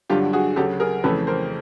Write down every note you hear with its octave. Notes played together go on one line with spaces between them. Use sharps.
G2 D3 F#3 F4 G4
F#4 G#4
D2 C#3 F#3 G4 A4
G#4 A#4
F2 C#3 E3 A3 A4 B4
A#4 C5